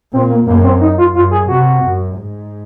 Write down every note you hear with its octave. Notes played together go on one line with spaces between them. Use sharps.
A#2 C4
A#3
F#2 A#3
C4
D#4
F4
F#2 F4
G#4
C3 F#4
F#2
G#2